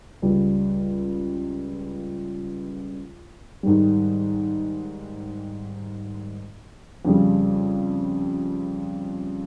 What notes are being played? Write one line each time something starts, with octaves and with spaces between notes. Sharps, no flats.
C#2 C#3 G3
G#2 D#3 G3
F2 C#3 G3